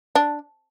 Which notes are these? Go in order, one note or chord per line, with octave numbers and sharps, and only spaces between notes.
D4